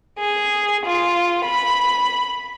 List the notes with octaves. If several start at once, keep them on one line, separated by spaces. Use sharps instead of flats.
G#4
F4
B5